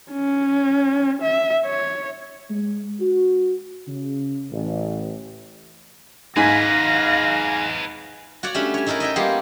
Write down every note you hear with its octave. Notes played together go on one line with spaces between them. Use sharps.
C#4
E5
C#5
G#3
F#4
C#3
A1
G#2 G#4 B4 F5 G#5 A#6 B6
F#4 C#5 D5 F#5
G3 A3 C#4 D4
C#5 G#5
A3 D#4 E4 A4 A#4
D#5 E5 G5
G3 A#3 B3 F4 G4 G#4